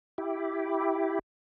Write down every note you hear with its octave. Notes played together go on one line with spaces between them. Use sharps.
E4 G4